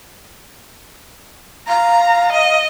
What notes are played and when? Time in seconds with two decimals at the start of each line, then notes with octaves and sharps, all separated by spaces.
1.68 F5 A#5
2.32 D#5